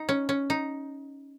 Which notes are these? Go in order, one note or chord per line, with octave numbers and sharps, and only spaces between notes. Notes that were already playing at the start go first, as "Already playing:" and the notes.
Already playing: D#4
C#4
C#4
D#4